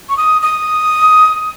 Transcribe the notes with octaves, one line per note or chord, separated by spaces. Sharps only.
C#6
D#6
D#6